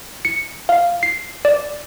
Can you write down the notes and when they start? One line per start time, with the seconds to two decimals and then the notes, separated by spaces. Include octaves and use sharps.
0.25 C#7
0.69 F5
1.03 C7
1.45 D5